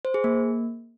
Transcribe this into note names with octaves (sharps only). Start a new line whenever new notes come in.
C5
G#4
A#3